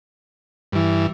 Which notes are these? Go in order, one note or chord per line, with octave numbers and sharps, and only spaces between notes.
G2 E3